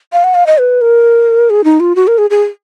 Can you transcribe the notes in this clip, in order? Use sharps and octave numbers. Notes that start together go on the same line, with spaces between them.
F5
F#5
F5
D#5
B4
A#4
G#4
D#4
F4
F#4
A#4
G#4
G#4